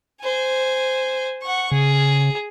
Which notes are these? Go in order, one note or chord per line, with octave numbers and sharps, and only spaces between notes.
C5 G#5
F#5 C#6
C#3 G#4